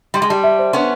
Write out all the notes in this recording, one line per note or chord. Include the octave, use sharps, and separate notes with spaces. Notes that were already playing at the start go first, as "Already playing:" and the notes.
G3 C6
G#3
G3 A5
E5
C5
B3 C#4 C6